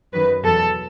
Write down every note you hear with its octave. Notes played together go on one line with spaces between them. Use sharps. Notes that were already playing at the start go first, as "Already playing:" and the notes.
F#2 D#3 F#3 B4
E2 B2 F#3 A4